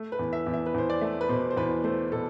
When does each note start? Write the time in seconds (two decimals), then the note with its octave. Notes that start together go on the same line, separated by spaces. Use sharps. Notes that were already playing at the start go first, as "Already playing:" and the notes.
Already playing: A3
0.12 B4
0.19 E2
0.33 E5
0.47 E2
0.54 E5
0.66 B4
0.74 E2 C5
0.90 D5
1.01 A3 E5
1.21 B4
1.29 B2 C5
1.51 C5
1.57 E2 B4
1.84 A3 C5
2.12 B2 A4